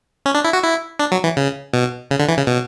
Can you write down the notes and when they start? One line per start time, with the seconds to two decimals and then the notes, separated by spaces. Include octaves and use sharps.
0.26 C#4
0.35 D4
0.45 E4
0.53 F#4
0.63 E4
0.99 D4
1.12 F#3
1.24 E3
1.37 C#3
1.73 B2
2.11 C#3
2.20 D3
2.29 E3
2.37 C#3
2.47 B2